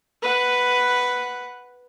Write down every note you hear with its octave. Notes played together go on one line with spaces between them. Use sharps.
B4 F#5